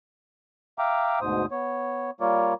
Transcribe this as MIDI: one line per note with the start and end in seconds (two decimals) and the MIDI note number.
0.79 1.19 76
0.79 1.19 77
0.79 1.19 79
0.79 1.19 82
0.79 1.19 86
1.21 1.46 38
1.21 1.46 44
1.21 1.46 47
1.21 1.46 72
1.21 1.46 87
1.51 2.11 59
1.51 2.11 73
2.21 2.54 55
2.21 2.54 58
2.21 2.54 65
2.21 2.54 70
2.21 2.54 73
2.21 2.54 74